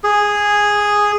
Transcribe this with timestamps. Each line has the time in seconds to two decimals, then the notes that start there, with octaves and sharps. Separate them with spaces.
0.04 G#4